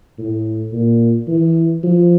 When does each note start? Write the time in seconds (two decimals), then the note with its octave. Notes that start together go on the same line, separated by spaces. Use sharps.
0.19 A2
0.73 A#2
1.28 E3
1.83 F3